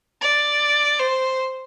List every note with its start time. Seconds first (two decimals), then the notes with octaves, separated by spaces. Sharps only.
0.21 D5
0.99 C5